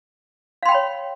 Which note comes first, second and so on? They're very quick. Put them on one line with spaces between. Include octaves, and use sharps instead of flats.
F5 C6 G5 B5 C#5